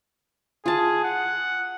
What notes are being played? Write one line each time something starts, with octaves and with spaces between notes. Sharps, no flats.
F4 G#4 A5
F#5